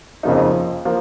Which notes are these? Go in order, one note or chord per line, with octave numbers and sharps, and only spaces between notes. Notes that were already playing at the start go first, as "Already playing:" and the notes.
F2 C#3 F3 A#3 D#4
F3 A#3